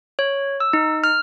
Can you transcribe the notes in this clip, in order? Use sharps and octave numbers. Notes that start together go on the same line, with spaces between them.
C#5
E6
D#4
F6